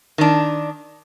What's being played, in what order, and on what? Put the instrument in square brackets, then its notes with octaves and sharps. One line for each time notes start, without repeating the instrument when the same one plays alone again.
[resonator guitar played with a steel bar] D#3 D4